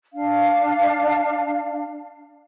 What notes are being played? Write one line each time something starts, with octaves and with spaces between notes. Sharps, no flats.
D4 F5